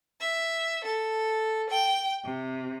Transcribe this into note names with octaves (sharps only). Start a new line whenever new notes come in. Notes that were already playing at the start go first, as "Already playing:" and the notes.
E5
A4
G5
C3